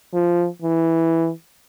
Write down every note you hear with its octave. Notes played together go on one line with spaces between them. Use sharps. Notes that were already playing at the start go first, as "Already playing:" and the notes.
F3
E3